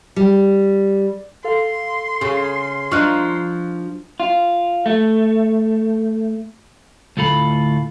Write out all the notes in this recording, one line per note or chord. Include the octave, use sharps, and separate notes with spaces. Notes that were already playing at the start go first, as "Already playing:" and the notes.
G3
A4 F5 C6
C#3
F3 D4 D#4 C#6 F6 F#6
F4
A3
D2 A2 A3 F4 A4 B5